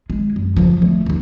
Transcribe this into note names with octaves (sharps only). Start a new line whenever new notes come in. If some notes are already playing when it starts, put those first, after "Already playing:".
G#3
F#2
C#3 F3
A3
D#2 D#3